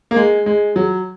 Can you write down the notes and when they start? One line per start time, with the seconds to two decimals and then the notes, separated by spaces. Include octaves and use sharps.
0.11 A#3
0.16 G#3
0.46 G#3
0.76 F#3